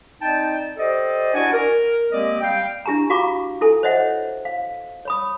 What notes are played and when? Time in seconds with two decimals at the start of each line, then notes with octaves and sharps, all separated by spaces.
0.22 C4 D#4 D5 D#5 G5 A5
0.77 G4 A4 C5 D5 D#5
1.34 D4 E4 F#4 D5 F#5 G#5
1.53 A#4
2.11 G#3 A#3 C4 G4 D5 D#5
2.41 G3 F5 G5
2.86 D4 E4 G4 G#5 A#5
3.10 F4 F#4 F5 A#5 C#6 D6
3.61 E4 A4 G#5
3.83 C5 C#5 D#5 E5 F#5
4.45 F5
5.05 C#5 B5 D#6